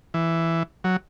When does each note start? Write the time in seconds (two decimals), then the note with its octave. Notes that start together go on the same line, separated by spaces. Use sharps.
0.14 E3
0.84 F#3